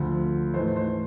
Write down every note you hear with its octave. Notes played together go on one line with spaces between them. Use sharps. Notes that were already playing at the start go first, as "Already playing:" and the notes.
Already playing: D2 D3 F3
G#2 E3 A3 C5
C5